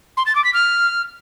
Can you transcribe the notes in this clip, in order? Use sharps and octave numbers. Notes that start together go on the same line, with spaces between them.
C6
A6
D6
B6
F6